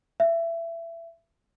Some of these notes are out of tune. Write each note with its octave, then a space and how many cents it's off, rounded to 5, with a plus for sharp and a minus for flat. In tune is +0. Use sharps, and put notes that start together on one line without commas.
E5 +25